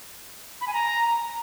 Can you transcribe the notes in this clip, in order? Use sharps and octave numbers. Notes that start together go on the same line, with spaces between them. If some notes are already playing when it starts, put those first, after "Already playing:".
B5
G#5
A#5